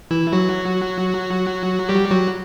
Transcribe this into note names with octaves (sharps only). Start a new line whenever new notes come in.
E3 E4
F#3 F#4
G3 G4
F#3 F#4